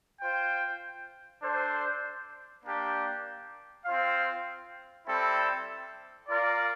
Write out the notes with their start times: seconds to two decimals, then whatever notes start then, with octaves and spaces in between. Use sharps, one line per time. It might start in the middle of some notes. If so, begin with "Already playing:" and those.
0.21 F4 C5 G5
1.42 D4 A4 C5
2.64 A#3 D4 G4
3.85 C4 F4 C5 F5
5.07 G3 C4 E4 A4
6.29 F4 A#4 D5